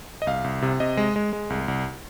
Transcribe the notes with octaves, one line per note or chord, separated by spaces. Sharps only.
D#5
C2 F5
C2
C3
C3 D#5
G#3
G#3
G#3
C2
C2